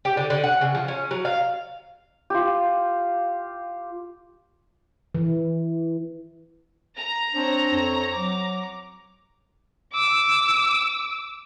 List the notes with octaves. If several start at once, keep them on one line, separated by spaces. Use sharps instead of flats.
G4
D3
D3
F#5
C#3
F3
C#4
F#3
F5
F4 G4
E3
A#5
C4 D4 C#5
F2
F#3 D6
D6 E6